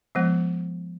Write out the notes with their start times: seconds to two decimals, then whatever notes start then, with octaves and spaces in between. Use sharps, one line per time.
0.15 F3 G#3 B3